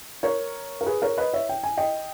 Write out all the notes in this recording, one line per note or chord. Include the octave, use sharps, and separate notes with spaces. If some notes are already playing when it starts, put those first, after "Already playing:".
A#4 C#5
A#4
G#4 B4
A#4 C#5
B4 D#5
C#5 E5
G5
G#5
D#5 G5